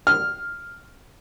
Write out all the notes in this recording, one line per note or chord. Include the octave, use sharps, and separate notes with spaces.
F6